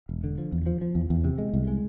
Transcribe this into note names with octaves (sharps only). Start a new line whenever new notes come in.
E1
D3
F3
E2
F3
F3
E2
E2
C3
G#3
C2
G#3